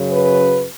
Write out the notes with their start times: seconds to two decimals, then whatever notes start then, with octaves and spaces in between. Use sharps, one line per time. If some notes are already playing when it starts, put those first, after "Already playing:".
Already playing: F#2 C#3 F#3
0.11 B4